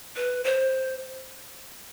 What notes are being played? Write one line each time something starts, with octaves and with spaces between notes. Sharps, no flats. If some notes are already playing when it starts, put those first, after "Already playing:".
B4
C5